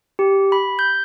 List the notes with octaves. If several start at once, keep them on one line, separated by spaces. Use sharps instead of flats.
G4
B5
G6